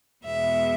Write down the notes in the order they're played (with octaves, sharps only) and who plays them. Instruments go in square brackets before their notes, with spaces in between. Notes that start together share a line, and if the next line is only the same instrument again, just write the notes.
[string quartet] E2 B2 G#3 E5